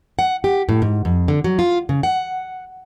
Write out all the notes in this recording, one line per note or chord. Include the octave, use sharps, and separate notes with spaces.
F#5
G4
A2
G#2
F2
D3
F#3
F4
C#3
F#5